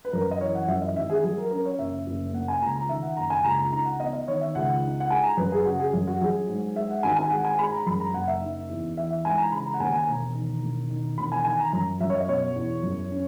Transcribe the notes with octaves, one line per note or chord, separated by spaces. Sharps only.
B4
F#2 A#4
D#5
E3 C#5
F#5
F#2 E5
D#5
G#1 E5
G#4
F#3 G#4
A#4
C#4 A#4
C#5
F#1 E5
F#1
A#3 F#5
G#5
C#2 A#5
A#5
D#3 E5
F#5
F#1 A#5
G#5
C#2 A#5
A#5
D#4 A#5
F#5
B3 D#5
D#5
D#3 C#5
E5
C#2 F#5
D#4
F#5
G#3 G#5
A#5
F#2 B4
G#4
C#3 F#4
G#4
F#2
F#4
F#3 G#4
G#2
G#3 E5
F#5
G#1 G#5
G#5
G#3 F#5
G#5
G#3 B5
A#5
F#2 B5
A#5
F#1 F#5
E5
D#4
E2
E3 E5
E5
G#2 G#5
A#5
C#3 B5
A#5
F#5
D#2 G#5
G#5
E1 A#5
D#3
E1
D#3
E1 B5
G#5
D#3 G#5
A#5
F#2 A#5
F#2 E5
C#5
D#5
B2 C#5
E2
F#2
C#4